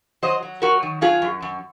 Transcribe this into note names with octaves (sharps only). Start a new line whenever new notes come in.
F#3 C5 D#5
F#3
F#3 F#4 A#4
D#3
F#3 F4 G#4
F#2
F#2